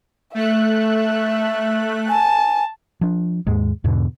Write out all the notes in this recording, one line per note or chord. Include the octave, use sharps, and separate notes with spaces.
A3 E5 F#6
G#5 A5
F3 D4
D#2 G#2 G#3
E2 G#2 B2 D3